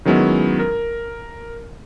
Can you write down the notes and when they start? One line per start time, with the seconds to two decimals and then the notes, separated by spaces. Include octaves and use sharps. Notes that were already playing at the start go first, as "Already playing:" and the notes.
0.05 D#3 F#3 G#3 B3 C#4 E4
0.59 A#4